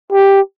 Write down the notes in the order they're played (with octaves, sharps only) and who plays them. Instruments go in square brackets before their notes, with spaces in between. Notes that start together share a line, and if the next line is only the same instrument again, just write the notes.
[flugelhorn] G4